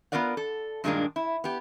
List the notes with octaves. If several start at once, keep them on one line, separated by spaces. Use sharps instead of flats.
B3 C#4 F4 A#4 D5 F#5
A4
G2 A#2 D#3 G#3 A#3 D4
E4
B3 G4